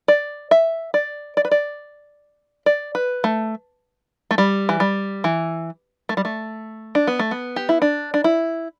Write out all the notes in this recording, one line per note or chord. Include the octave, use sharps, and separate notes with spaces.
D5
E5
D5
D5
B4
D5
D5
B4
A3
A3
G3
E3
G3
E3
A3
G3
A3
D4
B3
A3
B3
G4
E4
D4
D4
E4